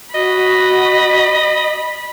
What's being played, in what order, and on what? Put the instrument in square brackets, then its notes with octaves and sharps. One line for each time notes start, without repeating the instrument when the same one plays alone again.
[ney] F#4 [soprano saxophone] D#5 [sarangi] B5